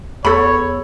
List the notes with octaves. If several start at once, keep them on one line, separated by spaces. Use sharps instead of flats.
E2 A4 C#5 B5